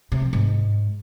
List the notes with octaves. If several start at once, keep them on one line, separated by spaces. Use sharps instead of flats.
C3
F3
G#2